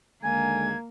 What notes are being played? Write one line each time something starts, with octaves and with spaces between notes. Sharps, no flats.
D#2 D3 G#3 A#3 G#5 G#6